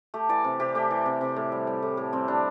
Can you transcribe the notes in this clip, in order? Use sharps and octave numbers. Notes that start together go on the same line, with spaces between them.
A3 G4
E3 D5
C3
C3 G4
A3 G4
E3
C3
C3
A2
G3
G3
A2
A2
G3 C4
G3 D4